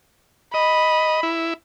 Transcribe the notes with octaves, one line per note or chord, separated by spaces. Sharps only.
D#5 B5
E4